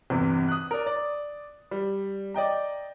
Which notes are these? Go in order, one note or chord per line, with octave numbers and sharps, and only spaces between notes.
G1 E2 C3
D#6 F#6
A#4 D5
D5
G3
D5 D#5 G5 A#5